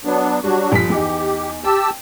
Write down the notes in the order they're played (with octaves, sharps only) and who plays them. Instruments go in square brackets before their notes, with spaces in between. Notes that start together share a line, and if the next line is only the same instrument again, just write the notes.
[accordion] F#3 B3 D4
[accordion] F#3 D4 F#4 [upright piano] G3
[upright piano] G1 F3 B6
[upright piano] E2 D#4 [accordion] G4
[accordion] G4 A5 E6 [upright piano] G5